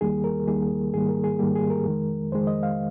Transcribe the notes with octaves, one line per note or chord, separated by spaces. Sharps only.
D#2 D#3 G3 A#3 G#4
A#4
D#2 D#3 G3 A#3 G#4
G#2 D#3 G3 A#3 G#4
A#4
G#4
G#2 D#3 G3 A#3 G4
G#4
A#4
F2 D#3 G#3
F2 D#3 G#3 C5
D#5
F5